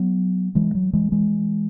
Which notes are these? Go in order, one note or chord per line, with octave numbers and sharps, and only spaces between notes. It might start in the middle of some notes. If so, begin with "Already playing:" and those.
Already playing: F#3 B3
E3 G#3
F#3
E3 G#3
E3 G#3